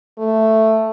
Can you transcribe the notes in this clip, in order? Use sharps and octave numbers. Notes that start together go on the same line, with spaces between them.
A3